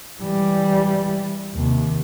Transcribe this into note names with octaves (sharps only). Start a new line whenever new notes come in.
E3 G3
D#2 C3